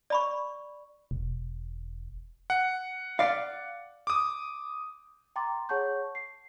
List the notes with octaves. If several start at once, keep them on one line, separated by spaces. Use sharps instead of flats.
D5 B5 C#6
E1
F#5
D5 F5
D6 D#6
G5 A#5 C6 D6 A6
G#4 C#5 F#5 A5 C#6 G6
C7